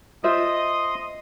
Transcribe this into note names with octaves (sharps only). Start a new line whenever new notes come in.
F4 C5 D#5 E5 C6 D#6